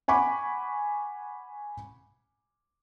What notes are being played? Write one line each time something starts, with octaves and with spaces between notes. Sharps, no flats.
F#5 G#5 B5 C#6 D6